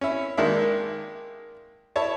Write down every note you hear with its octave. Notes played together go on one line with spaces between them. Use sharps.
C#4 E4
D#3 G#3 A#3 D4 E5
E4 C#5 A5